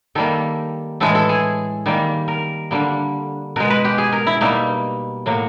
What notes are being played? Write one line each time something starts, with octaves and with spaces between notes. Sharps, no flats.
D#3 G3 A#3 A4
A2 E3 G#3 A4
A4
G#4
D#3 G3 A#3
A#4
D3 G3 A#3
B2 G#3 A#4
B4
G4
G#4
A#4
E4
B2 G3 A#3 D#4
A2 F#3 A#3